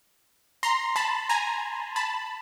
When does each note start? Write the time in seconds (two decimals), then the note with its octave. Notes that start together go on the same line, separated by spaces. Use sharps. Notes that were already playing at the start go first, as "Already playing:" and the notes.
0.63 A#5 C6
0.96 A5 B5
1.29 G#5 A#5
1.96 A5 B5